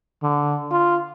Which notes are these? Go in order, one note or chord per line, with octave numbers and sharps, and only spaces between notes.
D3
F4